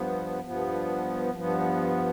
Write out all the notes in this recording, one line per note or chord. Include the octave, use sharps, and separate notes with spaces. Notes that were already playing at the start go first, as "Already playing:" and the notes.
Already playing: G2 F3 B3
G2 F3 B3
G2 F3 B3